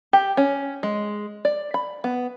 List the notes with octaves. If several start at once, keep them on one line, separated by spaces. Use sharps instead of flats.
G4
C#4
G#3
D5
B5
B3